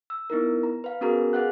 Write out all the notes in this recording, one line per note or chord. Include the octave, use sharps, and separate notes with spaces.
E6
B3 D#4 E4 A#4
A#5
B4 F5
B3 C#4 F#4 G#4 A#4 A#5
G#4 B4 F5 F#5 F#6